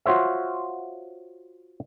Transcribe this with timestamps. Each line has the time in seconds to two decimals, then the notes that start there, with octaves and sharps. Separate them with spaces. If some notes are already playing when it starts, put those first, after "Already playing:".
0.06 F4 F#4 C5 C#5 E5